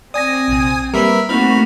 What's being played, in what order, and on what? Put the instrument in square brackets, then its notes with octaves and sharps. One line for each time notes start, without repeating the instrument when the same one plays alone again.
[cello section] C4 [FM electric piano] D5 A#6 [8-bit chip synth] G#5 D#6
[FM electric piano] A#1 C3
[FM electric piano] G3 A#3 B4 [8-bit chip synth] A#4 E5 B5
[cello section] A3 A#3 F#4 [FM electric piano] C4 D#4 [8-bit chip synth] B5 F6